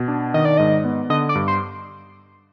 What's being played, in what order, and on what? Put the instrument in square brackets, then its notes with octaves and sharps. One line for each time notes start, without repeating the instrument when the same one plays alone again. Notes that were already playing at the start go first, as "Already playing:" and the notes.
Already playing: [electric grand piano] B2
D4
[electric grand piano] D#3 [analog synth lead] D#5
[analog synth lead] D5
[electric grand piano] G#2 [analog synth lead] D#5
[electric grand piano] B3
[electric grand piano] D3 [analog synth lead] D#5
[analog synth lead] D5
[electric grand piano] G2
[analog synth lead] C5